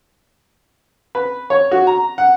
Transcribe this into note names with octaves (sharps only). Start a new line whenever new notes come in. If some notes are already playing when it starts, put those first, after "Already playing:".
B4
C#5
F#4
A#5
F#5